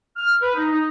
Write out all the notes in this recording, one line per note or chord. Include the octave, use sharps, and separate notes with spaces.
F6
B4
D#4
D#4